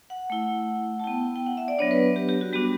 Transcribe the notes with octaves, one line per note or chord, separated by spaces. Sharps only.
F#5
A3 E4
A5
B3 E4 G5
G5
F#5
E5
D5
F#3 B3 D4 C#5
B4
G4
G4
F#4
G3 B3 D4 F#4 G4